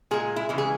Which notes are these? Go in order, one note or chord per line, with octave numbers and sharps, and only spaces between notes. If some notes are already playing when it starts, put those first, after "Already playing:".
A#2 G#3 G#4
E4
C#3 E3 G#3
G#4